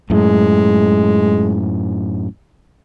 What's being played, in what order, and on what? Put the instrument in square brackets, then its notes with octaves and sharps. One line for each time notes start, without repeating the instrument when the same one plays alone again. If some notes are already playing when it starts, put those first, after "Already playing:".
[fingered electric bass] F#2 A2 [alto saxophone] G#3